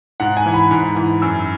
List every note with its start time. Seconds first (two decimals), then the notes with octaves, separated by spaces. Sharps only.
0.20 G#2 F#5
0.37 G#5
0.46 E3
0.54 B5
0.71 G#2
0.96 E3
1.22 F#2 E6